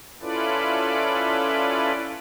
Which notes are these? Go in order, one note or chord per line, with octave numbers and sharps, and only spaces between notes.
C#4 E4 F4 A4 B4 D5